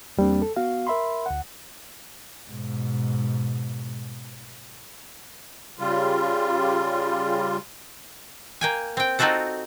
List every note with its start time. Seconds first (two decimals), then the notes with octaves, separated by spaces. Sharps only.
0.17 E2 G3 A#3 C4 D4
0.42 A4
0.56 B3 F#4 F5
0.87 A#4 E5 B5 C6
1.26 D2 F#5
2.46 G#2 B2
5.79 C#3 G3 F4
8.61 A#3 G5 G#5
8.97 C4 G5
9.19 C4 D#4 F4 F#4 A4 F#5